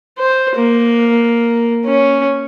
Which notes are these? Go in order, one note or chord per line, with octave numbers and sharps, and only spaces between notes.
C5
A#3
C#4